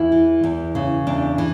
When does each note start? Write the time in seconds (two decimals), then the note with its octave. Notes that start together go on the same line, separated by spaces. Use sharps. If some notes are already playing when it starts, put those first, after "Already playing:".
Already playing: E2 E4
0.12 E3
0.44 E2
0.75 C#3
1.07 E2 D4
1.38 E3